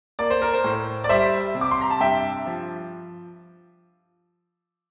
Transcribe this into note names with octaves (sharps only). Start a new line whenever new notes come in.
A#3 D5
C5
A#4
C5
A2
D5
G3 C5 E5
C3
D6
C6
A#5
A5
G2 E5 G5
F3